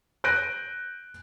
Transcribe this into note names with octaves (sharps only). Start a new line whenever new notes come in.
F#6 G6 A#6 D7 D#7